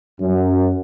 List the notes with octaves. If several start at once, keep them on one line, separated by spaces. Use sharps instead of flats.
F#2